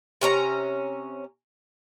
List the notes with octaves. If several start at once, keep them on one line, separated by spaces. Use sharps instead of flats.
C3 C#4 D#4 A#5